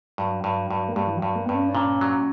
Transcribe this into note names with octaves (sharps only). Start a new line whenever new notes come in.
G2 F#3
G2
G2
A#3
G2 G3
E3
F#3
G2
A#3
G2 B3
C#4
D4
A#2 C#4
F#3